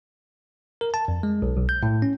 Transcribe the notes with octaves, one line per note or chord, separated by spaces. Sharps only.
A#4
A5
F2
G#3
B1
B1
G6
A2
C#4